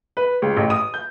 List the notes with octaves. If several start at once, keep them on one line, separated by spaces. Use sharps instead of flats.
B4
C#2
A1
D#6
G6